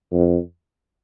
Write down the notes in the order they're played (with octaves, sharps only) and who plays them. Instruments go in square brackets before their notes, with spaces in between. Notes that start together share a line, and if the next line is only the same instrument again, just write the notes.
[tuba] F2